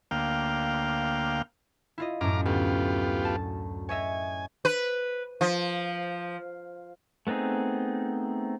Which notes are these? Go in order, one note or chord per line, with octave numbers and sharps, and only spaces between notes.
D2 A#3 F5 G5
E4 F4 D#5
F#2 A2 F5 A#5 D6
D2 B3 F4 G4
A5
C#5 D#5 E5 G#5
B4
F3
A3 B3 C4 D#4 G#4